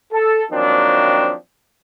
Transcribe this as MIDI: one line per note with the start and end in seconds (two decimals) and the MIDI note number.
0.12 0.43 69
0.51 1.33 51
0.51 1.33 53
0.51 1.33 54
0.51 1.33 58
0.51 1.33 60
0.51 1.33 62